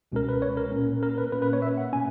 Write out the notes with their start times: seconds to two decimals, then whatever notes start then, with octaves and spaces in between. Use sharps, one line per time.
0.12 C#2 B2 G#3 C#4 A#4
0.29 B4
0.42 C#5
0.57 A#4
0.71 A#2 A#3 C#4
1.03 A#4
1.18 B4
1.32 A#2 A#3 C#4 B4
1.42 B4
1.53 C#5
1.62 E5
1.78 F#5
1.93 B2 A#3 C#4 G#5